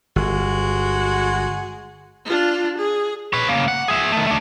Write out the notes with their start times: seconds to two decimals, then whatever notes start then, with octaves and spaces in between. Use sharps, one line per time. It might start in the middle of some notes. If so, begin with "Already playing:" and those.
0.16 G1 G#3 F#4
2.25 D4 F4
2.78 G#4
3.33 B4 C#5
3.48 C#3 A#3
3.68 F#5
3.88 G#4 E5
4.12 D#3 A3
4.26 A3 D4